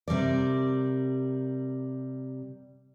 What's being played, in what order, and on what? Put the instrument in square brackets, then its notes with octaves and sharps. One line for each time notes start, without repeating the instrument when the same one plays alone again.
[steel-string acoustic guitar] C3 G3 A#4 D5